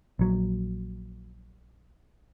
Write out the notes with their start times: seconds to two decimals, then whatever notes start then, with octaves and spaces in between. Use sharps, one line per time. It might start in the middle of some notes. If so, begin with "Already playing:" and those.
0.19 A#1 F#3